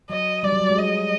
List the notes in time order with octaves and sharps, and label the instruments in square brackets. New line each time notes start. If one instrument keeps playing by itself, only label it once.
[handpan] F#3 [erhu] D#5
[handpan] G3 [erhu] D5
[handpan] F#3
G3
G#3
[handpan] G3 [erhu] D#5